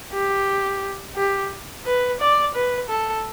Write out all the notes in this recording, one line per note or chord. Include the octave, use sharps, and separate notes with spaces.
G4
G4
B4
D5
B4
A4